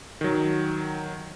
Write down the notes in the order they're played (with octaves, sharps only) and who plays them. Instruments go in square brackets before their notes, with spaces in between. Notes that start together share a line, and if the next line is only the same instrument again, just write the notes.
[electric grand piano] D#3 F#3